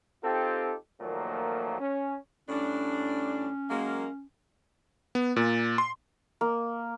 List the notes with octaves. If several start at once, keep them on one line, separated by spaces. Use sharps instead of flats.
C4 D#4 F4 G4 A4
A#2 D#3 F3 F#3 A3 A#3
C#4
A2 G3 C#4 D4
F#3 G#3 A#3
B3
A#2
C6
A#3